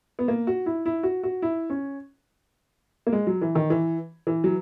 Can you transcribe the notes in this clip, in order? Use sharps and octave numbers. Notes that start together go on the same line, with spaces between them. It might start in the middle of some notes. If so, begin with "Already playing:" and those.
B3
A#3
F#4
E4
E4
F#4
F#4
E4
C#4
A#3
G#3
F#3
E3
D#3
E3
E3
F#3